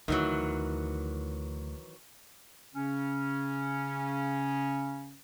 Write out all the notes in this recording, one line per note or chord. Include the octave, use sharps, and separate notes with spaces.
D2 D#3 E3 F#3
C#3 C#4